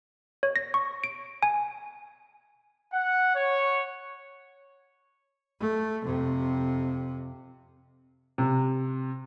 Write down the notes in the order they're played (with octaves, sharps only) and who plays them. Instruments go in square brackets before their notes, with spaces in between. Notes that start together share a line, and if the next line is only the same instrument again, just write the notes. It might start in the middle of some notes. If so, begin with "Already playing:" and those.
[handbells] C#5
A#6
C#6
D7
G#5
[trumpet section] F#5
C#5
[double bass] A3
F2 C3
[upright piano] C3